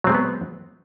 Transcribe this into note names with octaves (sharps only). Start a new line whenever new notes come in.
F#3 G#3 B3 C4 G#4